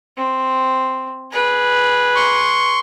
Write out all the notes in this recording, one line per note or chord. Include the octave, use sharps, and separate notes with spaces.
C4
G#4 B4
C6 C#6